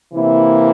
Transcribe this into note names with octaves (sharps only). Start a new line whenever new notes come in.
C3 E3 A#3 E4